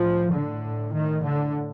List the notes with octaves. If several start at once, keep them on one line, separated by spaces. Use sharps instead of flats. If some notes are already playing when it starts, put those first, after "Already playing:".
Already playing: A2 F3
D3
D#3
D3